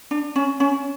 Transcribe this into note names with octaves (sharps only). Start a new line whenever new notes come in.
D4
C#4
C#4